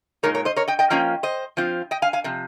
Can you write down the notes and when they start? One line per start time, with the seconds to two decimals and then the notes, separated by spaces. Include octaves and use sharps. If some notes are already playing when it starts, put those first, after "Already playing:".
0.23 A#2 G#3 D#4 A#4 C#5
0.35 A#4 C#5
0.45 C5 D#5
0.56 A#4 C#5
0.68 D#5 G5
0.79 D#5 G5
0.90 F3 A#3 C#4 F4 D#5 G5
1.23 C5 D#5
1.57 F3 C4 F4
1.91 D#5 G5
2.02 F5 G#5
2.13 F5 G#5
2.24 C3 F3